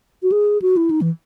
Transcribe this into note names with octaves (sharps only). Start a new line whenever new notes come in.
F#4
G#4
F#4
E4
D#4
E3